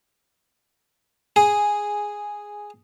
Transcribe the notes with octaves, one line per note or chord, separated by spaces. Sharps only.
G#4